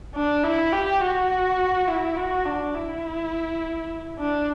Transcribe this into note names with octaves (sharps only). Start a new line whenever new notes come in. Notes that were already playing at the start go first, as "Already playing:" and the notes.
D4
E4
G4
F#4
E4
F#4
D4
E4
D4